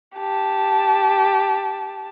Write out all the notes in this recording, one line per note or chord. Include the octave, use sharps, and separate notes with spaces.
G4 A5